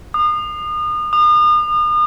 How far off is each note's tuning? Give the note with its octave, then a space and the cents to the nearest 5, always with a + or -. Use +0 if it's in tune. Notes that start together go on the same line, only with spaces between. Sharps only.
D#6 -35
D#6 -40